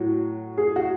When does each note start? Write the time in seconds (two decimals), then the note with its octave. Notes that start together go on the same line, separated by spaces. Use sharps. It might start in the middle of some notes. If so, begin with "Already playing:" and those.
Already playing: A2 F#3 F#4
0.58 G#4
0.76 F#4